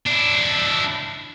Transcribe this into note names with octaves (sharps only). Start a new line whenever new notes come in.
D4 E4